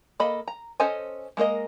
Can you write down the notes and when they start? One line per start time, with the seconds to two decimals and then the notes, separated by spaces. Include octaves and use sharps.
0.20 A#3 A4 D#5 B5
0.48 A#5
0.80 C#4 A4 C5 D#5 G#5
1.37 G#3 A#3 A#4 D#5